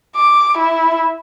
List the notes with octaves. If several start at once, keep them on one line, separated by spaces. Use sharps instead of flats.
D6
E4